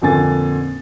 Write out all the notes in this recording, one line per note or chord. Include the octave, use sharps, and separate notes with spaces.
F2 A#2 D3 G#5 A6